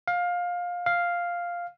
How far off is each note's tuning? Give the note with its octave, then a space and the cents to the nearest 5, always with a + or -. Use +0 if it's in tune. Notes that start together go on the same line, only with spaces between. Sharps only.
F5 +20
F5 +0